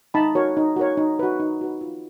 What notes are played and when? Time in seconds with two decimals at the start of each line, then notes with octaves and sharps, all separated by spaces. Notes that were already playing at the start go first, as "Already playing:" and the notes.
0.14 D#4 A5 B5
0.35 F#4 A#4 C#5
0.57 D#4
0.76 F#4 A#4 C#5
0.97 D#4
1.19 F#4 B4
1.40 D#4
1.61 F#4 B4
1.81 F4